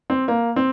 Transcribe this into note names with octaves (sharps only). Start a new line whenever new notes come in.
C4
A#3
C4